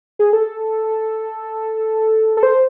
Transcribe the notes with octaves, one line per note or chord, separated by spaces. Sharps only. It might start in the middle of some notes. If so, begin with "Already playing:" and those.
G#4
A4
A4
C5